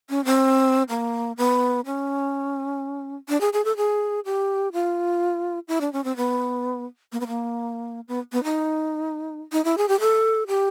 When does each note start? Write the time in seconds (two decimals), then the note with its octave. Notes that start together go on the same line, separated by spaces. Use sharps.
0.10 C#4
0.25 C4
0.89 A#3
1.37 B3
1.86 C#4
3.29 D4
3.41 G#4
3.53 G#4
3.65 A4
3.77 G#4
4.25 G4
4.73 F4
5.68 E4
5.81 D4
5.93 C#4
6.04 C4
6.17 B3
7.12 A#3
7.20 B3
7.27 A#3
8.08 B3
8.32 B3
8.44 D#4
9.53 D#4
9.65 E4
9.78 G#4
9.88 G4
10.00 A4
10.48 G4